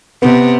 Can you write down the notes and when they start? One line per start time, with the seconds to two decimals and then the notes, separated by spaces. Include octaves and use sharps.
0.22 C3 B3